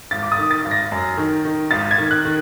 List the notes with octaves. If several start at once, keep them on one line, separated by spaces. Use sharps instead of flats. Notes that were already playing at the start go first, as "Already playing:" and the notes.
G#1 A6
D6
D#6
D#3
A6
G#1
A#6
F#2
D#3
D#3
G#1 A6
G#6
D#3
F#6
D#3